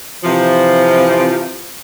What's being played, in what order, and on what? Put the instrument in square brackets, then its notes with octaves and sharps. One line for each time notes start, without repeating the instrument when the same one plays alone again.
[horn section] C3 E3 F3